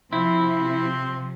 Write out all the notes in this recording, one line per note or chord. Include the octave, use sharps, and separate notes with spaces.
C3 F3 C4 E4